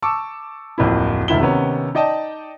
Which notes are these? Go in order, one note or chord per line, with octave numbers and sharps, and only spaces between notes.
A5 C#6 D6 E6
D1 F2 A#3 E4
E1 D2 D#3 E4 E5 G7
C3 D#3 B3 C#4
D#4 D5 D#5 G5 A5